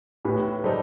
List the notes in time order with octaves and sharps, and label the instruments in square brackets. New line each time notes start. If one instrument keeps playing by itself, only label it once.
[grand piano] A2 [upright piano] G4 B4
[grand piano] G3 D#4 [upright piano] A4 C5